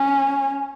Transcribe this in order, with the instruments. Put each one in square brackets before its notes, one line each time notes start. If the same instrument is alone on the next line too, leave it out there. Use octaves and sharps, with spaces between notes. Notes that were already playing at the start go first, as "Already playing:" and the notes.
Already playing: [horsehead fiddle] C#4